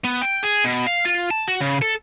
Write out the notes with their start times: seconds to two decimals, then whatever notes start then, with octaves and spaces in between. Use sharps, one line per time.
0.04 B3
0.22 G5
0.43 G#4
0.64 B2
0.87 F5
1.05 F4
1.31 A5
1.48 F#4
1.61 C#3
1.82 A4